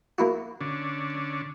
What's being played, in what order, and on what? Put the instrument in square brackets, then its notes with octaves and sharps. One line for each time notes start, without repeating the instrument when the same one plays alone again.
[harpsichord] A#3 E4 F#4
[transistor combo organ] D3 C#4 D4